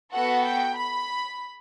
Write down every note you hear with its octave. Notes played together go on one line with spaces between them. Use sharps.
B3 F#4 A4 F#5
G5
B5